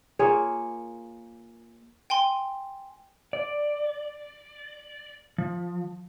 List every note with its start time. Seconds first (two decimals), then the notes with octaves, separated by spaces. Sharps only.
0.19 A#3 F4 G#4 C#5
2.10 G5 G#5 C6
3.33 D5
5.38 F3